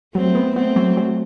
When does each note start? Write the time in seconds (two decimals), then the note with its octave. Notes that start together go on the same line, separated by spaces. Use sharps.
0.15 F#3 A3 C4
0.35 B3
0.56 A3 B3 C4
0.76 F#3
0.97 F#3